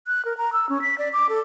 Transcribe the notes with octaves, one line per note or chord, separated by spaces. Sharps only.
F#6
A#4
A#5
E6
C#4
B6
D5
D6
A4